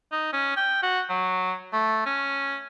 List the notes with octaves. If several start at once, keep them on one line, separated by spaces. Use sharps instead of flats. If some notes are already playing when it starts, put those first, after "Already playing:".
D#4
C#4
G5
F#4
F#3
A3
C#4